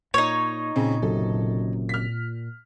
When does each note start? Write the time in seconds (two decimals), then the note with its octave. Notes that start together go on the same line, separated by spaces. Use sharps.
0.14 A#2 D#4 C#5
0.76 A#2 C#3 C4 C#4
1.02 F#1 F#2 C3 A4
1.89 F6 B6